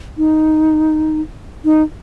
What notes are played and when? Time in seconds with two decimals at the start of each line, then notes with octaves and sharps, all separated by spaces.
0.18 D#4
1.65 D#4